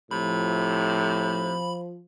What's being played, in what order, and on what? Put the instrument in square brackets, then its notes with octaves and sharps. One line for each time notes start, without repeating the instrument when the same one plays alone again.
[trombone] A2 [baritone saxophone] C3 [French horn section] F3 [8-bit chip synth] B5